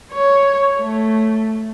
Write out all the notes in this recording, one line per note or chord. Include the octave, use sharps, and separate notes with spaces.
C#5
A3